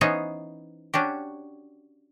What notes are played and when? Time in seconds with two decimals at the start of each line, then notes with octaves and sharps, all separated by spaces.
0.01 E3 B3 C#4 D#4 C5 C#5
0.94 C#4 D4 F#4 G4